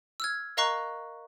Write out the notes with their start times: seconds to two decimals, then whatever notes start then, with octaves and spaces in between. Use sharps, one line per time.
0.20 E6 F6 G#6
0.57 A#4 D#5 F5 A#5 C#6 F#6